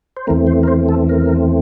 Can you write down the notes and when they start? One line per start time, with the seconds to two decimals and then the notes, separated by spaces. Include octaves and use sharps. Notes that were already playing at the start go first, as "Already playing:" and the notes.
0.17 C5
0.27 E2 E3 A3 C4 A#4
0.47 C5
0.63 A#4
0.68 C5
0.89 A4
1.09 A#4